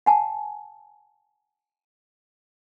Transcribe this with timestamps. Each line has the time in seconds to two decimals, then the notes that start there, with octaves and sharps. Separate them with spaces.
0.06 F#5 G#5 A5